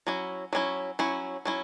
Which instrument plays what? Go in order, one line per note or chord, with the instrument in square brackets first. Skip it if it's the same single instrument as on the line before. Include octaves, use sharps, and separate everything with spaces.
[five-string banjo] F#3 C#4 E4
F#3 C#4 E4
F#3 C#4 E4
F#3 C#4 E4